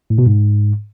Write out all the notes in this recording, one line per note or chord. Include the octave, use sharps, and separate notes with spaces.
A2
B2
G#2